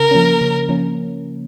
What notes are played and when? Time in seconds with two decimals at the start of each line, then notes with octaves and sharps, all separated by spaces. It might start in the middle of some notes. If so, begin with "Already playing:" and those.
Already playing: C#3 A#4
0.11 F3 A#3 C#4
0.41 C#3
0.69 F3 A#3 C#4